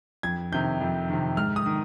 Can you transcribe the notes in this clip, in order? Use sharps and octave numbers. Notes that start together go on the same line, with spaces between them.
F2 G#6
C3 D#3 G6
F2
C3 D#3
G#2 F6
D#6
D#3